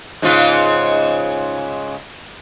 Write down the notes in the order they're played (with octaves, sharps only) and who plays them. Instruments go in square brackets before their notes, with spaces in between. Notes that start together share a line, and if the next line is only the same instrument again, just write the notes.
[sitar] G#2 C#3 F4